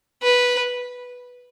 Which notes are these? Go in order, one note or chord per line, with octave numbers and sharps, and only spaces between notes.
B4